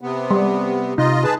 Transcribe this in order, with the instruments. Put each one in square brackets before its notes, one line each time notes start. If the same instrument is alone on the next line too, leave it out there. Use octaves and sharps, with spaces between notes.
[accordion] C3 B3
[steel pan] G3
[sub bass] C3 [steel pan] D#4 [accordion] F4 D#5
[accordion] G#4 B4 A5